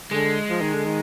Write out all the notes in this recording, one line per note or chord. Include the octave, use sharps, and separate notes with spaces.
D3 G#3
F3
D#3
D3
D#3